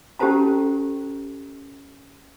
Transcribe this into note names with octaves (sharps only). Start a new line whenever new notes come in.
C#4 G4 A4 C5 A5 A#5